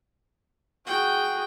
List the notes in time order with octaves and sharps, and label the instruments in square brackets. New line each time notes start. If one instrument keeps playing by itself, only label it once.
[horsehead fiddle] F#4 G#4 [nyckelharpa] G5